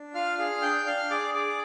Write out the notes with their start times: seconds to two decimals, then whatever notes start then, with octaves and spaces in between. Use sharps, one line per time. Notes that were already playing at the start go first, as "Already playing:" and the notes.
Already playing: D4
0.14 F4 F5 F6
0.38 G#4 F5 F6
0.62 D4 G5 G6
0.86 D4 F5 F6
1.10 G#4 D5 D6
1.34 G#4 D5 D6